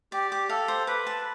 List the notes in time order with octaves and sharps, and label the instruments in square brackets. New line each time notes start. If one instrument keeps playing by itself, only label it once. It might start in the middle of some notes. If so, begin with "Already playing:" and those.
[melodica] G4 [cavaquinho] D5
[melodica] G4 [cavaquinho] D6
[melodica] A4 [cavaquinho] F5
[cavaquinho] C5
[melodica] B4 [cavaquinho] D6
[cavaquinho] A5